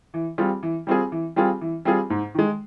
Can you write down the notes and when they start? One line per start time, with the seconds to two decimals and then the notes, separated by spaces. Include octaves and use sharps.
0.14 E3
0.38 G3 C4 F4 G#4
0.63 E3
0.87 G3 C4 F4 G#4
1.12 E3
1.36 G3 C4 F4 G#4
1.61 E3
1.85 G3 C4 F4 G#4
2.10 G#2
2.35 D#3 G#3